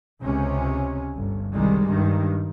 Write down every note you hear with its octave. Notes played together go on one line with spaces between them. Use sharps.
C#2 C3 C#4
G1
C2 D#3 G3 G#3
G2 D#3